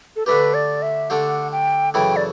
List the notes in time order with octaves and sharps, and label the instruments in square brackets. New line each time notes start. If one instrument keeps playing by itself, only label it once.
[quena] A4
[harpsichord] D3 A3 D4 G4 [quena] B4
[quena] D5
E5
[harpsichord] D3 A3 D4 G4 [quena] F#5
[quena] G5
[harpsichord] F#2 C#3 E3 A3 E4 [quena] G5
[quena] D5